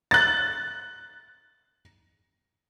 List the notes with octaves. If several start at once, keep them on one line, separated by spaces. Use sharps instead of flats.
F#6 A6